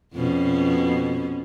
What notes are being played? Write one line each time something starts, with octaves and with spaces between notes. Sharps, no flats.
F2 B2 C#4